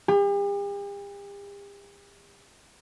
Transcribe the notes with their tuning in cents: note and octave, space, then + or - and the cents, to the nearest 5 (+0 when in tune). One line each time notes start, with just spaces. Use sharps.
G4 +45